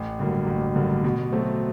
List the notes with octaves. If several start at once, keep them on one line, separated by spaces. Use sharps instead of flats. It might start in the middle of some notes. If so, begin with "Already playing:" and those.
Already playing: A1
G2 D3 F#3 A#3
A1
G2 D3 F#3 A#3
B2
F#3 A3 C4